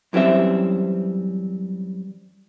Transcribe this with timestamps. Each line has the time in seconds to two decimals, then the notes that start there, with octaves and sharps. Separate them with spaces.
0.13 F#2 E3 G3 C4 E5